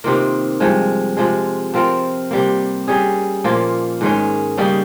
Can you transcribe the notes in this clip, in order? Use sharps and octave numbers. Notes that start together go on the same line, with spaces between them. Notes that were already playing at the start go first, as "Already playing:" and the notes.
C3 D#3 A#3 F4
G2 F3 G#3
C3 F3 G#3
F3 C4 F4 A#4
C3 G3 A#3
G3 C#4 G#4
A#2 F3 A#3 F4
G#2 D#3 G#3 C#4
C#3 G3 A#3 D#4